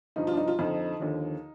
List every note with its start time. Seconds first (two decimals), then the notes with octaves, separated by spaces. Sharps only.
0.16 G2 F3 D#4
0.27 F4
0.33 D4
0.37 D#4
0.48 F4
0.58 F2 D3 F3 D#4
1.00 D#2 D3 F3